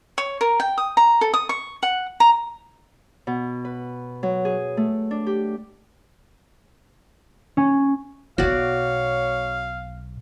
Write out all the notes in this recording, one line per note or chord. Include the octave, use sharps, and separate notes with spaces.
C#5
A#4
G5
D#6
A#5
A4
D#6
C#6
F#5
A#5
B2
B4
F#3
G#4
A3
D4
G4
C#4
B1 B2 F#4 C#5 D5 F5